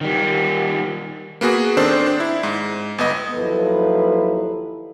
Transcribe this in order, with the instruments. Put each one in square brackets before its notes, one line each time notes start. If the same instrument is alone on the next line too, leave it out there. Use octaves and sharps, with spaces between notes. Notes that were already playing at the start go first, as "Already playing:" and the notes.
[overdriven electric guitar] D#3 G3
[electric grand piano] A#3 B3 F#4 G#4
D#3 C4 D4 A4 C5
D4
E4
G#2
G1 B3 D#5
[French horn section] D#2 F3 F#3 E4 A4 B4